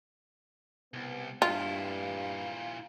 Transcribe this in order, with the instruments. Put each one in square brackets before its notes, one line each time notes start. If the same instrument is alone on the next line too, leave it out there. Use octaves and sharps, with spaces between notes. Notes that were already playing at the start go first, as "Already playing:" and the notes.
[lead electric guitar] C2 [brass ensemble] B2 B3
[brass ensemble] G2 [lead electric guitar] A#2 E4 [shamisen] F4 [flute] F5